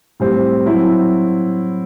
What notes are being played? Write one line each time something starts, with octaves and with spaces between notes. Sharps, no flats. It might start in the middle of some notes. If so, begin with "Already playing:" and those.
A2 G3 C4
F#3 C4 E4